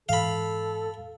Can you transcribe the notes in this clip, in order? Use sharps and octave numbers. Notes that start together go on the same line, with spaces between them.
G#2 E3 A4 F5 B5